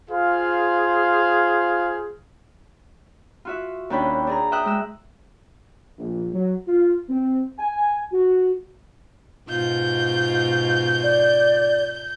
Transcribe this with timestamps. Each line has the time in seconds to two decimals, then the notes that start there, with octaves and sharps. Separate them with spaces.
0.10 F4 G#4 C5 F5
3.45 F4 F#4 E5
3.90 D#2 C#4 D4 G5 B5
4.27 D4 G#4 A#5
4.52 E5 G5 D#6 E6 F#6
4.65 G#3 E6
5.98 A#1
6.32 F#3
6.67 F4
7.09 C4
7.59 G#5
8.12 F#4
9.49 G#2 B2 F4 G6
11.03 D5